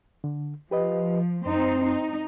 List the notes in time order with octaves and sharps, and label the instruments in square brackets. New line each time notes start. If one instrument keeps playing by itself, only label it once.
[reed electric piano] D3
[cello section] F3 [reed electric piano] G4 B4 D#5
[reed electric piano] F#2 [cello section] C4 D#4 C5
[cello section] D#4